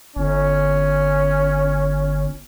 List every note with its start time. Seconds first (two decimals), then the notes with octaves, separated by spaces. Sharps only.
0.17 G1 C#4